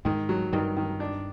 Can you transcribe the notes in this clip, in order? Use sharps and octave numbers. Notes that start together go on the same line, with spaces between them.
G#2 D#3 G#3
F#3
G2 D#3 G3
D#3
D4